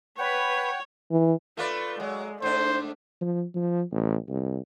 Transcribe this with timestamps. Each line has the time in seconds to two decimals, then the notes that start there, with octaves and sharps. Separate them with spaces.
0.18 B4 C#5 F#5 G5
1.11 E3
1.57 A3 F4 B4 D5
2.00 F#3 G#3
2.42 G#2 A3 D4 C5
3.21 F3
3.55 F3
3.92 A1
4.28 C2